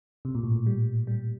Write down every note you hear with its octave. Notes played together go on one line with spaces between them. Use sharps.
C3
A#2
A2
A#2
G3
G3